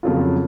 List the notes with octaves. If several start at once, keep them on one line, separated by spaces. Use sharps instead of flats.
F2 C#3 F#3 A#3 F4